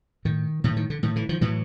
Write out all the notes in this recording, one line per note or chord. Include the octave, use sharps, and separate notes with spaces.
A2 D#3
A2 D#3
D#3
D3
A2 D#3
D3 E3
D#3 F3
A2 E3 F#3